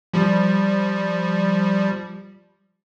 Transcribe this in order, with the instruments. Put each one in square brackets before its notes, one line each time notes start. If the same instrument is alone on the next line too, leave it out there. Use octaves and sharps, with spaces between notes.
[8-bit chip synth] F3 G3